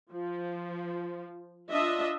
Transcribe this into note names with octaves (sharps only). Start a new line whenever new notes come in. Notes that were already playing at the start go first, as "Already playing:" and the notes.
F3
D4 F4 D#5 E5